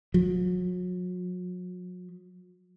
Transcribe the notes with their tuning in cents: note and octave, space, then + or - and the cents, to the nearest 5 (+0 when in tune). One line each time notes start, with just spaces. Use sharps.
F#3 -40